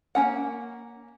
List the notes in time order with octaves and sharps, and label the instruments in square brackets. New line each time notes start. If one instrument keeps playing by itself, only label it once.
[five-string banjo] A#3 C#4 F#5